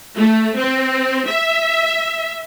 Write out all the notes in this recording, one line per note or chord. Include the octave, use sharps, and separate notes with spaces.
A3
C4
E5